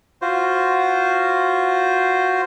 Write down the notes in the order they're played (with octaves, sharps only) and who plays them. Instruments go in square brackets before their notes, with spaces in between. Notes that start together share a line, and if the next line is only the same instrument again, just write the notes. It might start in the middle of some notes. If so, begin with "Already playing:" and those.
[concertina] F4 F#4 C5